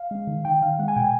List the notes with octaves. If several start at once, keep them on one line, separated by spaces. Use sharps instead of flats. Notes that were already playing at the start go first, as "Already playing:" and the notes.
Already playing: F5
G#3
D#3
D#3 G5
D#3 F5
G#3 F#5
G#5
B2 G5
G#5